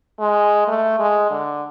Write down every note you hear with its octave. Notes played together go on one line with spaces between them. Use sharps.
G#3
A3
G#3
D3